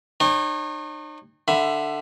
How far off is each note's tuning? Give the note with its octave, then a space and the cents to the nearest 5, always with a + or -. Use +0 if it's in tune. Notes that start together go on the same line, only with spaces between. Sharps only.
D#4 -40 C#5 -35 G5 +40
D3 +15 E5 +15 B5 +0